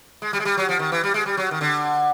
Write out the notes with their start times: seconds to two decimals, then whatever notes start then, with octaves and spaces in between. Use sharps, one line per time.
0.22 G#3
0.33 G3
0.40 G#3
0.45 G3
0.57 F#3
0.69 F3
0.79 D#3
0.92 E3
1.04 G3
1.14 G#3
1.26 G3
1.37 F#3
1.51 D#3
1.61 D3